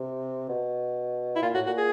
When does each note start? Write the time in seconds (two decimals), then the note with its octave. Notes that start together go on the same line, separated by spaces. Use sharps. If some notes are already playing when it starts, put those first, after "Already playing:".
Already playing: C3
0.49 B2
1.36 E4
1.42 A#2 F4
1.54 A2 F#4
1.66 A#2 F#4
1.77 G#4